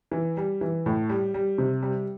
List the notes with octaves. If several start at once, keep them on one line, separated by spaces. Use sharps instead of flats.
E3
G3
E3
A2
G3
G3
C3
G3